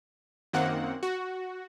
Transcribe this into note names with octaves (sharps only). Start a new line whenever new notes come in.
F#2 D#3 A#3 C4 F#5
F#4